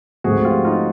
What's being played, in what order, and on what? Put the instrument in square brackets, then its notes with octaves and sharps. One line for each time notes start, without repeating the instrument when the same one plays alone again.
[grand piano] G#2 F3 A3 C4 [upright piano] F#4 G#4
[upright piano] F4 G4
D#4 F4